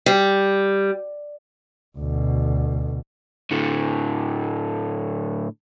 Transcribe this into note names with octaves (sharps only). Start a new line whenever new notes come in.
G3
D2 B2
A2 D3